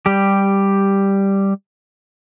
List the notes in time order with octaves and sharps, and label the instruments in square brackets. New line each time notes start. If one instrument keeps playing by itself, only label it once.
[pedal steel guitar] G3 G4